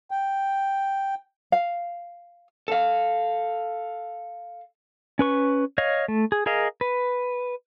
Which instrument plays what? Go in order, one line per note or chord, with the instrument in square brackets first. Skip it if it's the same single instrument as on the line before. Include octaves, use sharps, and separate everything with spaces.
[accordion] G5
[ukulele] F5
[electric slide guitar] A4 F5
[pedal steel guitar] C#4 B4 C#6
C#5 D#5 F5
A3
G#4
G#4 A#4 D#5 F5
B4